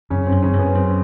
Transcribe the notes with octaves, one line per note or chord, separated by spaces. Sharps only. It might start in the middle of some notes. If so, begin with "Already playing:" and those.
F#2 C#3 C#4
C4
F#2
C#3 C#4
F#2
B3
F#2 C4